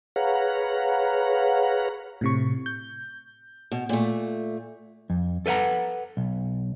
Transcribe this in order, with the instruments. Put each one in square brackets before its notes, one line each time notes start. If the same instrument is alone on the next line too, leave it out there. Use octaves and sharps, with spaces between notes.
[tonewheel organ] G#4 B4 C#5 F5 F#5 A#5
[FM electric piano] A2 C3 C#6
G6
[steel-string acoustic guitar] B2
A#2 A3
[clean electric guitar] F2
A4 B4 E5 F#5 A#5
B1